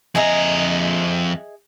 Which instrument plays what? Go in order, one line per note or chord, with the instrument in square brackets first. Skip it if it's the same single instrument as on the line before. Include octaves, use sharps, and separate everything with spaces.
[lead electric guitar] F2 A#5 [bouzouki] G#4 D#5 E5